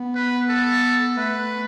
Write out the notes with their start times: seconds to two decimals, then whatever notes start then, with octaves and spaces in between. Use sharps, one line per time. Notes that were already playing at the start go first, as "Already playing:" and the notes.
Already playing: B3
0.15 B4
0.49 A4
1.18 A3 B4